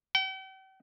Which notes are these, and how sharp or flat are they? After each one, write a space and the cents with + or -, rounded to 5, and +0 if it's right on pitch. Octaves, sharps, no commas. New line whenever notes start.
G5 -45